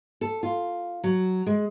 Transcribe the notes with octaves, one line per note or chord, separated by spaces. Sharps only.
A4
F4
F#3
G#3